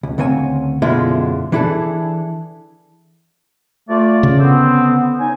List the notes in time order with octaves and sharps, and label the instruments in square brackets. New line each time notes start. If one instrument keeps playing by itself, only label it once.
[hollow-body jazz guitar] C#2
D2 C#3 C4 C#5 G#5
F#2 B2 D3 G#3 E4 F4
E3 D4 E4 G#4 A4
[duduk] A3 [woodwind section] F4 D5
[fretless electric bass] C#3
[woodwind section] D3 C4 [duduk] B3
[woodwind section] C#4 D#4 G#5